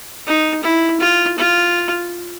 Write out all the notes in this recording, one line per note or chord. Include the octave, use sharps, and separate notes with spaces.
D#4
E4
F4
F4